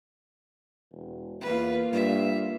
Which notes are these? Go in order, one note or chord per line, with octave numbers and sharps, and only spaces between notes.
E1
E2 A#3 B3 F4 B4
G2 E5